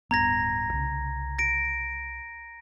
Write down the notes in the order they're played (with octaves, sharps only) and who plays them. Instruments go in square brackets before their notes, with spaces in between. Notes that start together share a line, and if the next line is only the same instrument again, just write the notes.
[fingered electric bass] D1 G2 B3 [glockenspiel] A#5 G#6 A#6
[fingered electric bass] C2 C#3
[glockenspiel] A#6 D7